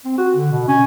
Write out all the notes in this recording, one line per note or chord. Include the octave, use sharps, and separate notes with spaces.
C4
F#4
D3
B2
C#4